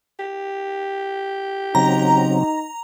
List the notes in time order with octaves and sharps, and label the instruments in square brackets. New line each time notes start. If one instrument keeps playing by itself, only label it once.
[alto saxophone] G4
[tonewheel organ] C#3 F#3 C4 [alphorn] D#4 [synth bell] A#5